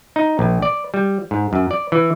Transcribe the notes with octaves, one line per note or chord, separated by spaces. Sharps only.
D#4
A#1
D5
G3
G#2
F#2
D5
E3